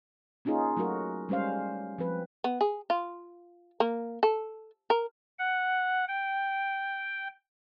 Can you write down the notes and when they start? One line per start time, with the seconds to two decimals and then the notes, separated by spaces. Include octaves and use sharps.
0.45 A#3 C#4 D#4 F4 G#4
0.77 F#3 A3 F#4 A#4
1.29 G3 G#3 C#4 C5 F5
1.98 F3 C4 B4
2.44 B3
2.61 G#4
2.90 F4
3.80 A#3
4.23 A4
4.90 A#4
5.39 F#5
6.08 G5